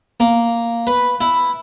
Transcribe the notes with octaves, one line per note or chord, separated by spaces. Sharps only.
A#3
B4
E4